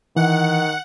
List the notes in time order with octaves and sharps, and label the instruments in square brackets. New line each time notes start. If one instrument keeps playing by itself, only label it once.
[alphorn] D#3 [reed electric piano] E3 [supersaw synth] F#5